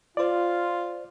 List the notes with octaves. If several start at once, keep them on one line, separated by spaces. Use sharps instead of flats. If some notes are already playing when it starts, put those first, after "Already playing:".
F4 C5 D5